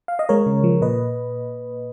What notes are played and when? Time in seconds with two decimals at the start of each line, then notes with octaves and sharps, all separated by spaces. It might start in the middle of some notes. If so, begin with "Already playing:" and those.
0.08 F5
0.19 D#5
0.29 G#3 A#4 C#5
0.46 C#3
0.64 F3
0.81 A#2 B4 D#5